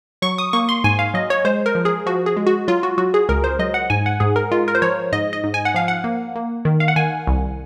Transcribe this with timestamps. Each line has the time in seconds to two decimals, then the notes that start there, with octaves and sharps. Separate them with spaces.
0.22 F#3 C#6
0.38 D#6
0.53 A#3 C#6
0.69 C6
0.84 G#2 G#5
0.99 F5
1.14 F#3 D#5
1.30 C#5
1.45 G#3 C5
1.66 A#4
1.75 F3
1.85 G#4
2.06 F3 F#4
2.26 G#4
2.37 G#3
2.47 F#4
2.68 F#3 F4
2.83 F#4
2.98 F#3 F#4
3.14 G#4
3.29 C#2 A#4
3.44 C5
3.59 F#3 D#5
3.74 F#5
3.90 G#2 G#5
4.06 F#5
4.20 G#2 G#4
4.36 A#4
4.51 G#3 F4
4.68 A#4
4.75 C5
4.82 F3 C#5
5.12 G#2 D#5
5.33 D#5
5.44 G#2
5.54 G#5
5.65 F#5
5.74 F3 F5
5.88 F#5
6.04 A#3
6.36 A#3
6.65 D#3
6.80 F5
6.88 F#5
6.96 D#3 G#5
7.27 C2